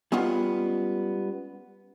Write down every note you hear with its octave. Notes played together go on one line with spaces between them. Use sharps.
G3 G#3 B3 C#4 F4